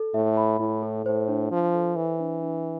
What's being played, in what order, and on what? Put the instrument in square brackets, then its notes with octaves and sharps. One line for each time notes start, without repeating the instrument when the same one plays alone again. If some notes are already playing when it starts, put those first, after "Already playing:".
Already playing: [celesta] A4
[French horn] A2 [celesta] E5
[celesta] B5
[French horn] A2 [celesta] E4
[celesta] A4
[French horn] A2 [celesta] C5
[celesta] D4
[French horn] F3 [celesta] D4
[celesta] A4
[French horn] E3 [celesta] C5
[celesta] D4
D4